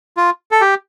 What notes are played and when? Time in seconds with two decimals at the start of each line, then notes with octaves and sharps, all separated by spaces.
0.17 F4
0.51 A4
0.61 G4